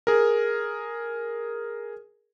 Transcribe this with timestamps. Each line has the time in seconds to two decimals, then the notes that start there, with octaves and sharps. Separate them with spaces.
0.07 G#4 A#4